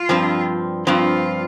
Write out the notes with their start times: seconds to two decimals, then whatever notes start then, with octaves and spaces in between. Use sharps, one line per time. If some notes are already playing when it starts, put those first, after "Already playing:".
Already playing: F4
0.09 G2 F3 C4
0.86 G2 F3 C4 F4